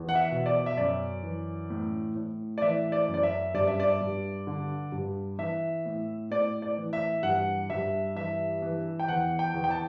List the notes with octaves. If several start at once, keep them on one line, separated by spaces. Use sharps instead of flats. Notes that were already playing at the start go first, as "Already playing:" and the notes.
Already playing: E2
F#5
E5
B2
D5
E5
F#2 D5
E3
A2
A2
D5
E3 E5
D5
F#2
D5
E5
G2 D5
E5
D5
G2
D3
G2
E3 E5
A2
A2 D5
D5
E3
E5
G2 F#5
G2 E5
E3 E5
E3
G5
E2 F#5
G5
E2
G5
A5